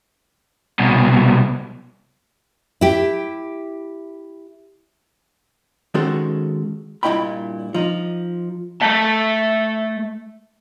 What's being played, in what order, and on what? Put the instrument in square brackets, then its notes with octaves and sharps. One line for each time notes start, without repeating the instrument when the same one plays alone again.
[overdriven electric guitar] C2 B2
[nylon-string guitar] E4 G4
[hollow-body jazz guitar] D#3 G#3 C#4 F#4 A4 C5
G2 A#2 E4 D#5 G5 B5
F3 D#4
[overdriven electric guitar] A3 A5